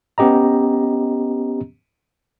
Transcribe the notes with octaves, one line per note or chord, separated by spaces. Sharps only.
B3 C#4 G4 D#5 A#5